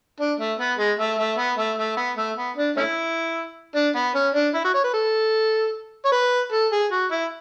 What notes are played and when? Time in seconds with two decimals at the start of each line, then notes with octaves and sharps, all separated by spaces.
0.20 D4
0.40 A3
0.59 B3
0.78 G#3
0.99 A3
1.19 A3
1.38 B3
1.58 A3
1.78 A3
1.97 B3
2.17 A3
2.37 B3
2.57 D4
2.76 A3 C#4 E4
3.75 D4
3.95 B3
4.15 C#4
4.34 D4
4.54 E4
4.64 F#4
4.74 C#5
4.84 B4
4.93 A4
6.05 C#5
6.12 B4
6.52 A4
6.72 G#4
6.92 F#4
7.11 E4